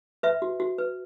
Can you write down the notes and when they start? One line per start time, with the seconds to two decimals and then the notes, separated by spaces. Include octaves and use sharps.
0.23 B4 E5
0.42 F#4
0.60 F#4
0.78 B4